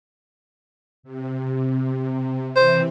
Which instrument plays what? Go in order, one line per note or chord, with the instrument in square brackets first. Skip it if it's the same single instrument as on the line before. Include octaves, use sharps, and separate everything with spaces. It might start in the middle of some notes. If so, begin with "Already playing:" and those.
[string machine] C3
[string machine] C3 E3 C4 [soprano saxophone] C5